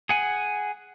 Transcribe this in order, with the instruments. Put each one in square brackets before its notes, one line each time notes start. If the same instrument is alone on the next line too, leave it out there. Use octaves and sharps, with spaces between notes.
[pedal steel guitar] G#4 F#5 G#5